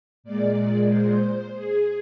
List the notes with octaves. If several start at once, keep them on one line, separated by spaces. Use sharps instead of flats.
A#2 G#3 D5
C5
G#4